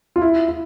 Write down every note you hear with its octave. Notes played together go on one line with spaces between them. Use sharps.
F4
E4
E4